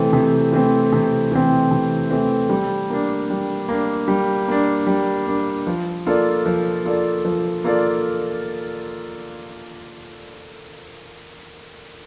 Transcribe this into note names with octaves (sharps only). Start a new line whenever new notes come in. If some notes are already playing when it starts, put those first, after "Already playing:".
Already playing: C3 E3 A3 C4
C3
E3 A3 C4
C3
E3 A3 C4
C3
E3 A3 C4
G3
A#3 D4
G3
A#3 D4
G3
A#3 D4
G3
A#3 D4
F3
A#3 F4 A4 D5
F3
A#3 F4 A4 D5
F3
A#3 F4 A4 D5